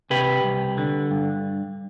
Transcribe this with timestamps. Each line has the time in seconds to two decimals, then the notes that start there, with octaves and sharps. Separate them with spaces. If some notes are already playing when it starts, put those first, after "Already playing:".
0.10 C3 G4 B4
0.44 C2
0.78 D3
1.11 G2